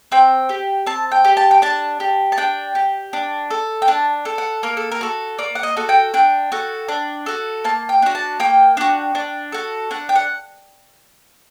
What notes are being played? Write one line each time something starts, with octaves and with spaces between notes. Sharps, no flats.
C4 G5
G4
C4 A5
G5
G4
A5
G5
D4 A5
G4
A5
D4 G5
G4
D4
A4
G5
D4 A5
A4
F#5
A#3 A#4
A4
A#4
F#4 A4
A#3 D5
F#5
D#5
F#4 A4
G5
D4 G5
F#4 A4
D4
F#4 A4
A#3 A5
G5
D4 F#4
A5
A#3 G5
D4 F#4
D4
F#4 A4
D4 F#5
G5
F#5